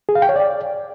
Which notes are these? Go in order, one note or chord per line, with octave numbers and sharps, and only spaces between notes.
G#4
F5
G5
C#5
D5